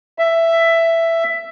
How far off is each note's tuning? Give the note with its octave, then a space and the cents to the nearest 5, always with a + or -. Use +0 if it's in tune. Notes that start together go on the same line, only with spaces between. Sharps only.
E5 +10